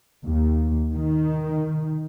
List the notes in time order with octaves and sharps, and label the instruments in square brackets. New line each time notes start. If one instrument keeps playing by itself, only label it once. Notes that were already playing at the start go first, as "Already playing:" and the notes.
[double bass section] D#2
D#3